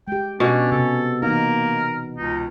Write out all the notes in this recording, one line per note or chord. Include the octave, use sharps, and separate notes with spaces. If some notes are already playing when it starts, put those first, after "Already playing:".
G#3 G4 G5
B2 C#4 D4
C3 A4
E3 A#3 D#4 A#4
C#2 D#4